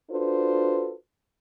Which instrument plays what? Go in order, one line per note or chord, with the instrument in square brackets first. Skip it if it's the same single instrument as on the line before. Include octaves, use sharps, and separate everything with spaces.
[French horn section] D4 F4 F#4 A4 B4 C5